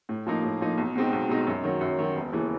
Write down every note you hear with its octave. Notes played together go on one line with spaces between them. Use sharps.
A2
F3 A#3 D#4
A2
F3 A#3 D#4
B1
B2 G#3 C4 D#4
B1
B2 G#3 C4 D#4
F#2
D#3 F#3
F#2
D#3 F#3
E1
D#2 C#3 E3